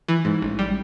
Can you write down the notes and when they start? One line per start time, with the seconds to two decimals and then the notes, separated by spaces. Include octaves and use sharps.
0.08 E3
0.25 G#2
0.42 A1
0.59 G3